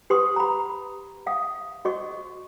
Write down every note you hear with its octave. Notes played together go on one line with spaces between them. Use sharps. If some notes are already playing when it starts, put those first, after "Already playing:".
G4 B4 C6 C#6 D#6
A#5 B5
E5 F5 D#6
F#4 D#5 C#6